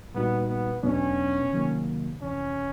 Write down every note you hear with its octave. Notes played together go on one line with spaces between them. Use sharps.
A#2 G3 A#3 B3 D#4 F#4
B3
E2 B2 F#3 B3 C#4 D4
C3 D#3 F#3 A#3
F2 C3 E3 C#4